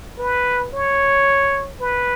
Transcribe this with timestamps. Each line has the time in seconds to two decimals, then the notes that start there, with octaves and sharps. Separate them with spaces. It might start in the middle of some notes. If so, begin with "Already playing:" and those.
0.18 B4
0.73 C#5
1.80 B4